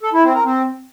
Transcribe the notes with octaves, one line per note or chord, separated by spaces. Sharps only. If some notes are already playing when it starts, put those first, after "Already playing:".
A4
E4
C4
A#4
C4